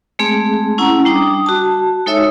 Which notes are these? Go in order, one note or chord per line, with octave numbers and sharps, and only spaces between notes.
G#3 A3 C4 G#4
C#4 E4 F#5 A#5
G3 D4 D6 D#6
F#4 A5
G#3 D#4 A4 C#5 E5 E6